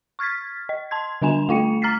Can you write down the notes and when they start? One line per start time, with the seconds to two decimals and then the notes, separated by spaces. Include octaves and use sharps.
0.19 C#6 F6 G#6 A6 B6
0.69 D#5
0.91 A5 C6 G#6
1.22 D3 G3 D4 G#5 E7 F7
1.49 A3 F4 G5 C#7
1.82 A#5 F6 A6 B6 C7